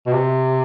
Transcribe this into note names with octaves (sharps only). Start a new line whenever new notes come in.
B2
C3